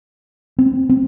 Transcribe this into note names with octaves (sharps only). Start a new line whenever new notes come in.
C4
C4